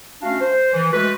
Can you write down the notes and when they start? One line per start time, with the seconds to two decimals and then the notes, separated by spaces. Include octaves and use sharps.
0.22 A3 C#4 D4 F#4 F5
0.40 C5
0.74 E3
0.93 G#3 A3 F#4 A4 B4